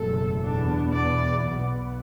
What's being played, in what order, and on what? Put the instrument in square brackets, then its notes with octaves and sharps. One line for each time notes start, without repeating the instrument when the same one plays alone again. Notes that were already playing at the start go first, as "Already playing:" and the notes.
Already playing: [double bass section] F#1 E2 B2 F#3 A3 [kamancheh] A4
[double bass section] E2 B2 B3 [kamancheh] D4
[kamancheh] D5
[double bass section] B1 B2 B3